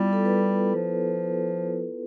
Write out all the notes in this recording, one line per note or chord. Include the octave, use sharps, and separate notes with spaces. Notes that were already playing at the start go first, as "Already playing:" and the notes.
Already playing: G3 B3 E4 F4
A4
B4
A4
F3